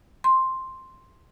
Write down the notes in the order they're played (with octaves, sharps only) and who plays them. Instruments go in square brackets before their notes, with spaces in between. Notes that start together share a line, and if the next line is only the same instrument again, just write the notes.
[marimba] C6